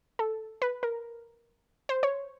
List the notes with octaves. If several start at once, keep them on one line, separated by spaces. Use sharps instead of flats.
A4
B4
A#4
C5
C#5